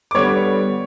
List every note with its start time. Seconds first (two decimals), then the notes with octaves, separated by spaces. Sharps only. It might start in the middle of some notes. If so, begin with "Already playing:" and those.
0.11 D6
0.15 D3 G3 B3 C#5 C#6